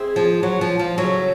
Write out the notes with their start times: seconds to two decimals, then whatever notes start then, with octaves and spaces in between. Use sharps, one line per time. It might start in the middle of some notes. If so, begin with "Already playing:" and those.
Already playing: G#3 C4 E4 G#4
0.16 F3
0.43 F#3
0.61 F3
0.79 F3
0.97 C#3 F3 F#3 A3 C#4